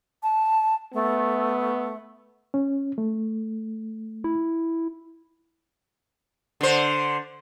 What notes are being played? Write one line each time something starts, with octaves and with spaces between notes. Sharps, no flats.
A5
A3 B3
C#4
A3
E4
D3 C5